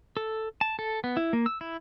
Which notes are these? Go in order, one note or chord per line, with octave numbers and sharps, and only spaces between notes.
A4
A5
A4
B3
E4
A#3
E6
E4